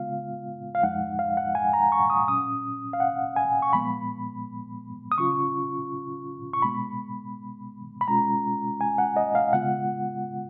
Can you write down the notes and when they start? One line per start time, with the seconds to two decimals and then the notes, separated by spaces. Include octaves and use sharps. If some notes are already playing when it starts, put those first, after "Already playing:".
Already playing: C#3 G#3 B3 F4 F5
0.75 F5
0.83 F2 F3 G#3 D#4 F#5
1.19 F5
1.37 F#5
1.55 G#5
1.73 A#5
1.92 C#6
2.10 D#6
2.27 A#2 F#3 C#4 D#6
2.93 F5
3.00 F#5
3.36 G#5
3.62 C#6
3.73 A#2 F3 G#3 B3 B5
5.12 D#6
5.18 C#3 F#3 C#4 F4 C#6
6.53 C#6
6.62 B2 G#3 B3 B5
8.01 B5
8.08 B2 G#3 C#4 F4 A#5
8.81 G#5
8.98 F#5
9.16 D#5
9.35 F5
9.53 C#3 G#3 B3 F4 F#5